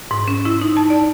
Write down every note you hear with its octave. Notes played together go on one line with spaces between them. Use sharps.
G#2
C#4
E4
D#4
A5
D5